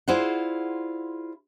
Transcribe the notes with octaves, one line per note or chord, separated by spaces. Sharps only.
E4 F4 G#4 C5 D5 F#5